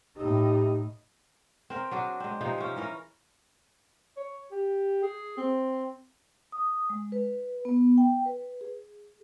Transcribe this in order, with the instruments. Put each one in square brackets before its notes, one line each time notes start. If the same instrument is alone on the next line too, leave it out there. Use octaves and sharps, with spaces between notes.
[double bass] A2 D#4 [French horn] G4
[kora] C4 A#4 G5
F#3 D4 G#4
G#3 C4
C3 F3 D#4
F3 C#4
E3 C#4 A#4
[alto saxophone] C#5
G4
G#4
C4
[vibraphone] D#6
G#3
B4
B3
G5
B4
G#4